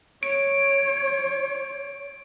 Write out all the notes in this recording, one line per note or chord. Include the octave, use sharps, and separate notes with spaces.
C#5 D7